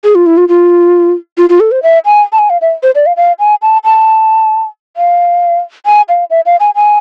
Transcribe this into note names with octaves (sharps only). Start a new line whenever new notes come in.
G#4
F4
E4
F4
F4
F4
F4
A4
C5
E5
G#5
A5
G#5
F5
E5
C5
D5
F5
F5
G#5
A5
A5
F5
G#5
F5
E5
F5
G#5
G#5